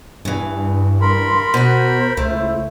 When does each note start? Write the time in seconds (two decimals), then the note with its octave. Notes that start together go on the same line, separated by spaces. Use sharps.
0.25 G2 C#3 E3
1.01 A#4 B5 C6
1.54 B2 F#4 C5
2.17 C#2 A3
2.34 E4